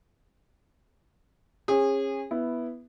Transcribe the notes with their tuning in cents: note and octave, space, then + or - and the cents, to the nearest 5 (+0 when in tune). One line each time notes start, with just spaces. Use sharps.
C#4 -30 G#4 -30
B3 -5 E4 +0